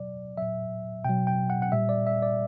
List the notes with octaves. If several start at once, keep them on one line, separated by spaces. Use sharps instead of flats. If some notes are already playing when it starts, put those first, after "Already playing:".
Already playing: B2 F#3 D5
A#2 F#3 E5
B2 F#3 G5
G5
F#5
F#5
A#2 G3 E5
D5
E5
D5